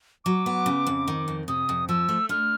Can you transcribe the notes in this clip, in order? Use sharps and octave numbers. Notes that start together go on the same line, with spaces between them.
F#3 D6
B3
C#3
F2
D#3
F2
C3 D#6
F2
F3 E6
A3
D3 F6